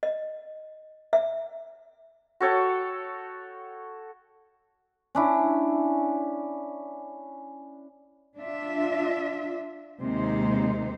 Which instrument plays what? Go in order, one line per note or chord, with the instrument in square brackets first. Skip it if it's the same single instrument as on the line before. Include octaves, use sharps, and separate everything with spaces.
[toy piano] D#5
E5
[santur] F#4 A4 C#5 G5
[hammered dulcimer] C#4 D4 E4
[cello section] D4 F4 E5
D#2 C3 G#3 D#4 C5